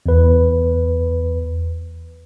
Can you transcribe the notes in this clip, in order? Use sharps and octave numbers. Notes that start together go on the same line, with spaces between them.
E2 B4